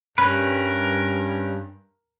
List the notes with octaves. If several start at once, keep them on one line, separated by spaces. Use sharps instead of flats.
G2 G3 C#4 A#4 B4 B5